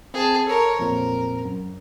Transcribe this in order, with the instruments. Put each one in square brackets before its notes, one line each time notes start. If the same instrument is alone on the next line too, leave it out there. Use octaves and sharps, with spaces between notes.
[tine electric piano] C4 [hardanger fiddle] G#4 A5
[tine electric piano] A4 [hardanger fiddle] A#4 C#5
[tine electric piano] F2 A#2 C5 [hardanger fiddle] A#4
[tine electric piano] F#2